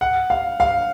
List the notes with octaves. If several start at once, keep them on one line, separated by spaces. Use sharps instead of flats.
F#5
F5
F5